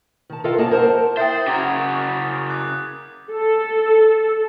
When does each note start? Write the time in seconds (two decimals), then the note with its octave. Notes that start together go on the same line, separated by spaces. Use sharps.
0.30 D#3 A5
0.44 F4 A4 A#4 D#5 F5 G5
0.58 A#3 G#4 C#5 D#5 G5 A5
0.71 A#4 C5 F#5 A5
1.17 E4 C5 E5 G5 D#6 G6 A6
1.47 C#3 F#4 A#4 D6 G#6
2.50 D6 F#6
3.31 A4